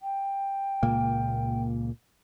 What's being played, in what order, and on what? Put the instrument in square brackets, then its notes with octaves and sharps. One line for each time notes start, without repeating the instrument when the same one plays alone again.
[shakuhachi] G5
[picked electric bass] C#2 A#2 A#3